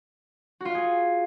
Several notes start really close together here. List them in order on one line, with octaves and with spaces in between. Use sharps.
F#4 F4 F5 G#4